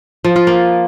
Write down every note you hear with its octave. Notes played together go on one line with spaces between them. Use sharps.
F3
F4
A#3